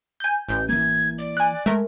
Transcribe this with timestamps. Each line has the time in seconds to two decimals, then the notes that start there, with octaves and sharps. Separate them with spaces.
0.20 G#5 G6
0.49 A1 G6
0.69 E3 A#3 G#6
1.18 D5
1.37 G#5 F#6
1.66 G#3 A3 A#4